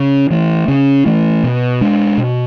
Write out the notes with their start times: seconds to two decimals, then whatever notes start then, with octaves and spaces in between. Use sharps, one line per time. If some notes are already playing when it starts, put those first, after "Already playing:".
Already playing: C#3
0.30 E3 A3
0.68 C#3
1.06 E3 A3
1.44 B2
1.81 G#3 D4
2.18 B2